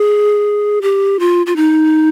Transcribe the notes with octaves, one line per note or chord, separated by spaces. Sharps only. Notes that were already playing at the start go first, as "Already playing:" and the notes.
Already playing: G#4
G4
F4
F4
D#4